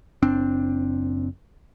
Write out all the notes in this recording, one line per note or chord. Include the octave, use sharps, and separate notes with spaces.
F#1 C4 D4